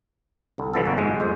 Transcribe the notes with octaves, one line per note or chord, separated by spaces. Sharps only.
C2 D3
C2 D3 E3 F3 B3 A4
G1 C#3 A#3 F#4
G1 G#2 G#3
F2 G#3 C5